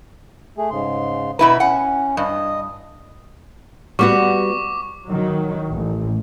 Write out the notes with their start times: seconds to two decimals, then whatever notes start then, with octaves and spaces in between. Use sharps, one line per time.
0.58 A3 G#4
0.70 G#2 C#3 C6
1.39 B2 E4 B4 A#5
1.60 C#4 F#5
2.17 G2 D#5 D#6
3.99 G3 B3 F#4 C#6 D6
5.08 D#3 F#3
5.69 A1